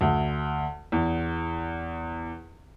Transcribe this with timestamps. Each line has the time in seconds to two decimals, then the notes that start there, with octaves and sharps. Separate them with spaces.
0.01 D2
0.92 E2